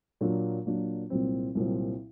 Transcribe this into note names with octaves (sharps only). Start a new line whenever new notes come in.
A#2 F#3 A#3 D4
A#2 F#3 A#3 D4
C2 A#2 F#3 C4
C2 A#2 F#3 C4